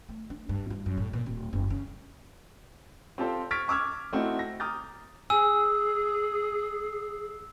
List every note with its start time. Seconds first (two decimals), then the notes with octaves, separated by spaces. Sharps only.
0.09 A3
0.30 D4
0.49 G2
0.70 F4
0.86 F#2
0.97 A2
1.13 A#2
1.26 D1
1.53 F#1
1.70 C#3
3.18 C4 F4 G4 A4 C5
3.51 C#6 F6 G#6 A6 B6 D7
3.68 C#6 D6 E6 F6 G#6
4.13 A3 C4 D#4 E4 F#4
4.39 A#6
4.60 A#5 D6 D#6 F6 G6 A6
5.30 G#4 G#5 E6